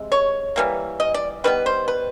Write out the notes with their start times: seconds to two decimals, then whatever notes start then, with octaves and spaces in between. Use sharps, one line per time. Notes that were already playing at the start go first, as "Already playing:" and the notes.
Already playing: C3 G#3
0.12 C#5
0.56 E3 G3 A#3
1.00 D#5
1.14 D5
1.44 D#3 G3 B3 B4
1.66 C5
1.88 B4